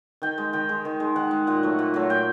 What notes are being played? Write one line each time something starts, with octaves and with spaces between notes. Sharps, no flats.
D#3 G5
G#3
D#3 G5
G#3
D#3
G#3
D#3 F#5
G#3
A#2 F#5
F#3 A3
A#2
F#3 A3
A#2 G5